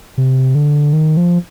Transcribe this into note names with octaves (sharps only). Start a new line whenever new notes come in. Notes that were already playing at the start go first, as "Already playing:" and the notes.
C3
D3
D#3
F3